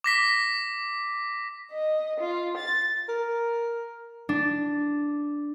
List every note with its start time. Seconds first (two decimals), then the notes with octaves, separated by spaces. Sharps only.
0.04 D6 A#6 B6
1.72 D#5
2.19 F4
2.56 A6
3.09 A#4
4.29 D4